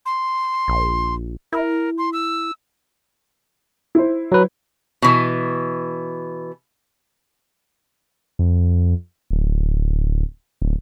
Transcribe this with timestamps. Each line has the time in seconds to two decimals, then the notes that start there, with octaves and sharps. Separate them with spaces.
0.06 C6
0.68 A#1
1.53 E4 A#4
1.98 C6
2.13 E6
3.95 E4 C5
4.32 F#3 B4
5.02 B2 E3
8.39 F2
9.31 D1
10.62 D1